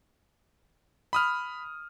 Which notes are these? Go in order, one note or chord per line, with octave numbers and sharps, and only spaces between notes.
B5 D#6 F6